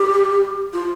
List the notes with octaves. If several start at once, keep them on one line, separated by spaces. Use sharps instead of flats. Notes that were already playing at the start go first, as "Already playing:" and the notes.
Already playing: G4
F4